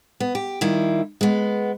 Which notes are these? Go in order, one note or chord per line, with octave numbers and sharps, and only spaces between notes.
B3
G4
D#3 G3 E4 F4
G#3 B3